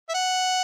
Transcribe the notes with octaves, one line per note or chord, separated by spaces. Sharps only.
E5
F#5